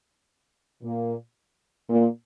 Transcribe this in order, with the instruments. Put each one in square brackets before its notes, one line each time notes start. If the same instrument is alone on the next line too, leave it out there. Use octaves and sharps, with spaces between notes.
[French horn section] A#2 A#3
A#2 A#3